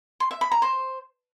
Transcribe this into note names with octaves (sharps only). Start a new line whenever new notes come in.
C6
E5
B5
A#5
C5